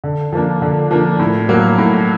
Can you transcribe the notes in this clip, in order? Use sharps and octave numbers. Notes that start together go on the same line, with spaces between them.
D3
F3 A#3 D4
D3
F3 A#3 D4
A2
F#3 A#3
A2